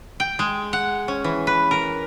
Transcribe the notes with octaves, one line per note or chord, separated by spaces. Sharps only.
G5
G#3
F#5
C#4
E3
B4
A#4